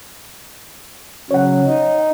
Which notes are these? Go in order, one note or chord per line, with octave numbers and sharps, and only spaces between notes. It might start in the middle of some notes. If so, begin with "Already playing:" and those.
C#3 F#3 C#5 F#5
D#4